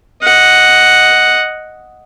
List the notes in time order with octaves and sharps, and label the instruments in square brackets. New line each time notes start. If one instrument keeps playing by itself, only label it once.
[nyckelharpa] D#5 F#5